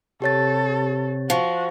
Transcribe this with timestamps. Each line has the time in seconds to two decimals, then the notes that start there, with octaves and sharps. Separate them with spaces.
0.22 C3 G4 A4 C#5 A6
1.30 F3 F#4